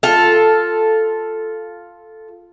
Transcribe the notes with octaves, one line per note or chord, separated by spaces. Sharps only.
F4 A4